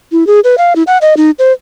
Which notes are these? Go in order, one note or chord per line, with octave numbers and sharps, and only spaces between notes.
E4
G#4
B4
F5
E4
F#5
D#5
D#4
C5